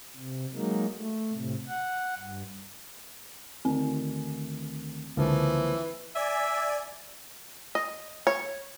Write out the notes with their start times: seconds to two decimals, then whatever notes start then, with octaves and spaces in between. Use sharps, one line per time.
0.16 C3
0.54 F#3 G#3 A#3 D#4
0.97 A3
1.33 A2 C3
1.68 F#5
2.18 G2
3.65 D2 D#3 C4
5.17 C#2 D3 E3 F3 A#3
6.15 D5 E5 G#5
7.75 D#5
8.27 C#5